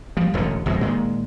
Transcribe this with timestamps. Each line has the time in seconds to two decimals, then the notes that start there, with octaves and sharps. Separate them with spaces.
0.17 F3 G3
0.34 E1 A1 E2 D3
0.66 G1 F2 B2 G#3
0.81 A#2 D#3 G#3